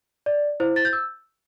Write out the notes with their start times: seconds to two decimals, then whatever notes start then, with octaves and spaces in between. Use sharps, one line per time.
0.26 D5
0.60 E4 C5
0.76 A6
0.85 G6
0.93 E6